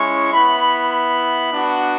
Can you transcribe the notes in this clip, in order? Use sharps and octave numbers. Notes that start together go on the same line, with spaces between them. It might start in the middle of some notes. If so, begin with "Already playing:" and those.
Already playing: G#3 C#4 E4 C#6
B3 E4 B5
B5
B5
B3 D4 F#4